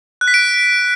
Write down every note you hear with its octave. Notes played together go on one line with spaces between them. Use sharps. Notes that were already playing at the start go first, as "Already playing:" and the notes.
F#6
B6
D7